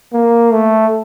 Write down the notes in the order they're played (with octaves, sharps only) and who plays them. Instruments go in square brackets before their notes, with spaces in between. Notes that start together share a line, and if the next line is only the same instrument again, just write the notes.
[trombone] A#3
A3